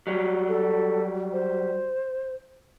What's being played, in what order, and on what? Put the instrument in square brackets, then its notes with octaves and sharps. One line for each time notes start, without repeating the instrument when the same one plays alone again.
[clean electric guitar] F#3 G3
[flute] A4
C5